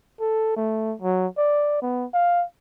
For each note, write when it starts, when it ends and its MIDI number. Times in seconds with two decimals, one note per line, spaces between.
0.20 0.56 69
0.56 0.95 57
1.02 1.27 54
1.38 1.79 74
1.82 2.05 59
2.14 2.44 77